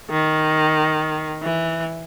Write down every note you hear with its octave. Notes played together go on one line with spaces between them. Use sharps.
D#3
E3